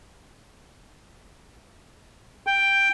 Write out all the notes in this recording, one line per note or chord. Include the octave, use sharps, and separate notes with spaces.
G5